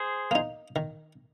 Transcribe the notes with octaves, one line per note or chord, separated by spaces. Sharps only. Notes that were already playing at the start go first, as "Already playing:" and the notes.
Already playing: G#4 C5
A#3 D#4
D#3